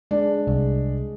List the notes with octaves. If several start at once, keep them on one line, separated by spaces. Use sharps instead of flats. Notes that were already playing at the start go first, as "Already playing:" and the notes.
G#3 D4
C2